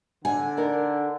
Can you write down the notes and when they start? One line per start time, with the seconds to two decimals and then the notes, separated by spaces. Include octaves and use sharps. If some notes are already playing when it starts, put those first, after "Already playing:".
0.25 D3 G#5
0.57 D4 D#4 A#4